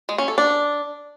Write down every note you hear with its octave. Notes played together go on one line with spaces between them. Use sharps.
G#3
C#4
A4
D4